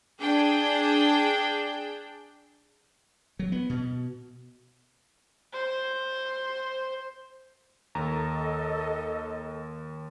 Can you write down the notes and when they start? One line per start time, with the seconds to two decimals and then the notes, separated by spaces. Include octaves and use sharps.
0.19 D4 G#4 G5
3.39 F#3
3.52 B3
3.70 B2
5.53 C5
7.95 D#2 A4 D#5 A#5